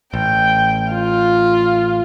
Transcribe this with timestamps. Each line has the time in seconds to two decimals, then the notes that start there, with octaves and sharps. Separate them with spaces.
0.14 A1 G5
0.91 F4